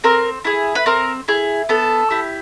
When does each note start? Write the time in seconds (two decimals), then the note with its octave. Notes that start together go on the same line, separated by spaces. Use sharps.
0.04 C4 A#4
0.45 E4 G#4
0.75 B4
0.86 C4 A#4
1.28 E4 G#4
1.69 B3 A4
2.10 E4 G4